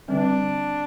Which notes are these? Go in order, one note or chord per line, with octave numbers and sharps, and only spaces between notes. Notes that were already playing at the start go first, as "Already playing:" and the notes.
D3 G3 C4 D4